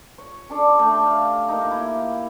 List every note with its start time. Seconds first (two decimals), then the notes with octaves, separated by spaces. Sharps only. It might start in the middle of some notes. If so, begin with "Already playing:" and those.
0.18 C#5
0.50 C#4 D4 A4 D5
0.79 A3 G4
1.06 F5
1.49 A#3 D#4
1.71 E4